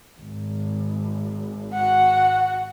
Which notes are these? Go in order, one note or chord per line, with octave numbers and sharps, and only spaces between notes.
G#1
F#4 F#5